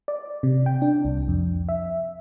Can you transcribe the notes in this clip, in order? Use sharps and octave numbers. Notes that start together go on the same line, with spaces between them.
D5
C3
G5
D4
C2
F2
E5